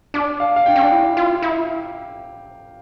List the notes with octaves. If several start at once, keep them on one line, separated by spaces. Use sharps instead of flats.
D4 D6
F5
F5
G5
C#4
D4
E4
F4
E4